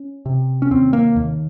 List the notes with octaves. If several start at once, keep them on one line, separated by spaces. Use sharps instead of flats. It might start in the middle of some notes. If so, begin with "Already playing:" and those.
Already playing: C#4
C3
C#4
D#2 C4
A#3
D#2